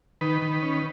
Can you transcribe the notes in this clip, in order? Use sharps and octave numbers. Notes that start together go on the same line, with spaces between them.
D#3 B4
D#3
C#4